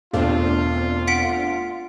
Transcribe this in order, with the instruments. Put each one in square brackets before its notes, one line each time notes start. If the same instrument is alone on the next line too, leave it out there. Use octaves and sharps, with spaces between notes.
[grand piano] E1 F5 [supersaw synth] A3 C4 D4 [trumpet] F4
[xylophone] F#5 B6 D7